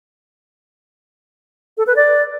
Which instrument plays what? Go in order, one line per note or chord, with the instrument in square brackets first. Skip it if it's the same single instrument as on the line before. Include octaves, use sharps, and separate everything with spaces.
[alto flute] A4
B4
D5